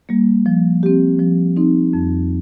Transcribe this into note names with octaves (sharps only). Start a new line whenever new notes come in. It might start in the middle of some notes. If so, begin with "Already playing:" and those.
G3 A#3
F3
C4 G4
F3
C4 D#4
F2